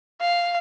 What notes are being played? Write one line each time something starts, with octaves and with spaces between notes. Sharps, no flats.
F5